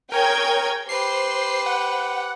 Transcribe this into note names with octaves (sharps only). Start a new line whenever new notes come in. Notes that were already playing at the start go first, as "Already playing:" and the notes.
G#4 A#4 C#5 G5 G#5 G#6
G4 B4 C5 C7
F#5